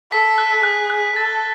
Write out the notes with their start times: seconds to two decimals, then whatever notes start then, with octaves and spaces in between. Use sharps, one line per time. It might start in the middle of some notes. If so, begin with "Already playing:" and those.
0.12 A4 B6
0.38 F#6
0.63 G#4 F#6
0.90 F#6
1.16 A4 A6